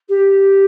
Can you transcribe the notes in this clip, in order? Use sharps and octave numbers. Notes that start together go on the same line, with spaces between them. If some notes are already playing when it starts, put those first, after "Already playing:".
G4